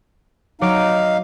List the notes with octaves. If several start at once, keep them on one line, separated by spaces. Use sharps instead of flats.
F#3 D#4 F5 D6 D7